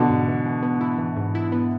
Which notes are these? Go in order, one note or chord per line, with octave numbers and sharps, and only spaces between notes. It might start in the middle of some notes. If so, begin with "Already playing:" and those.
Already playing: B2 D3 E3 B3
G#2
E3
E3
B3
E4
E3
G#2
E4
B3